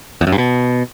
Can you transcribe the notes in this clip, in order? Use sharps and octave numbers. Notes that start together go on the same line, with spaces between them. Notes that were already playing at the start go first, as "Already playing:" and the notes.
E2
F#2
G2
B2